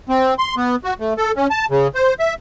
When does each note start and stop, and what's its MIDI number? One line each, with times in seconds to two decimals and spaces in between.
0.09 0.34 60
0.39 0.55 84
0.57 0.76 59
0.84 0.94 66
1.00 1.14 57
1.17 1.32 69
1.36 1.47 61
1.50 1.66 81
1.71 1.87 49
1.95 2.14 72
2.19 2.34 76